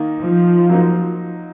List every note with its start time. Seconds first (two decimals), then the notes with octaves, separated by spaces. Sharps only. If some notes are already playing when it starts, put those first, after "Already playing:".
Already playing: D#3 A#3 D#4
0.20 F3
0.70 F#3 A#3 D#4